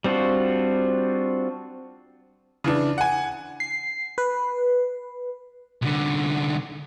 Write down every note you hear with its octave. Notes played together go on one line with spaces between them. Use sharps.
G3 C4 D4 F4 F#4
C#3 E3 D4
F#5 G#5
C7
B4
C2 D3